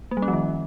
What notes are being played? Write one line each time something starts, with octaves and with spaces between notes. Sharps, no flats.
A#3
G3
C#4
F3
D#3